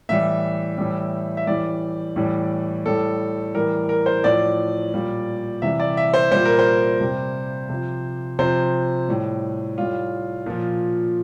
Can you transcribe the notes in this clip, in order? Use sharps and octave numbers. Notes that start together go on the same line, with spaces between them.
A2 E3 G3 E5
A2 E3 G3
E5
A2 E3 G3 D5
A2 E3 G3
A2 G3 A4
A2 E3 G3 A#4
A#4
C5
A2 F3 D5
A#2 G3
C3 E3 G3 E5
D5
E5
C5
A#2 G3 C5
A#4
C5
C3 G3
C3 F3
C3 F3 C5
A2 G3
A2 G3 F4
A#2 F3